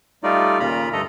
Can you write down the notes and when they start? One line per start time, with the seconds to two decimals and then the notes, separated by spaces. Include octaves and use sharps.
0.23 G3 A3 D#4 F4 D5
0.59 D#2 A#2 C#3 F4 A#5 B5
0.93 G2 D3 A3 A4 D#5 A#5